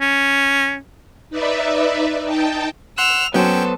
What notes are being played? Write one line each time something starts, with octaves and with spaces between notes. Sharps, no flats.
C#4
D#4 B4 D5 E5
D#4 G5 A5
F#5 C6 E6 F#6 F7
F#3 B3 C#4 A4 C5 G5